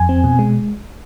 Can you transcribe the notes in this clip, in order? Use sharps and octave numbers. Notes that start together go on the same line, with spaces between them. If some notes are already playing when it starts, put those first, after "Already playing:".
Already playing: F2 G#5
C4
B2
G#3